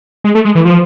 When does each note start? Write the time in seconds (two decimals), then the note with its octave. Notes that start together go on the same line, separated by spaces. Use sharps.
0.24 G#3
0.35 A3
0.45 G#3
0.55 E3
0.65 F3